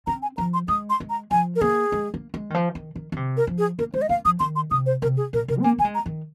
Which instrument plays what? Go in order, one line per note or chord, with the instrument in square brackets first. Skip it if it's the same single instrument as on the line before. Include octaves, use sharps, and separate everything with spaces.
[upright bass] C4 [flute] A#5
[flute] G#5
[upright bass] F3 [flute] A#5
[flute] C6
[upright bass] G#3 [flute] D#6
[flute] C6
[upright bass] G#3
[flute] A#5
[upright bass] F3 [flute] G#5
[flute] A#4
[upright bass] A#3 [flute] G#4
[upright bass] G#3
A#3
G#3
D#3
F3
D#3
D#3
D#3
C3
[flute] A#4
[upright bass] F3
[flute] G#4
[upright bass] A#3 [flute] A#4
[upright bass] G#3 [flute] C5
[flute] D#5
[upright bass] A#3 [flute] F5
[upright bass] F3 [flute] D#6
[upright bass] D#3 [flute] C6
[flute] C6
[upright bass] C3 [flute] D#6
[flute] C5
[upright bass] C3 [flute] A#4
[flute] G#4
[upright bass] A#2 [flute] A#4
[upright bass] C3 [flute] A#4
[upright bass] C4
[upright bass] A#3 [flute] G#5
[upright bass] A#3 [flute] G#5
[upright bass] G#3
[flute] A#5
[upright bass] D#3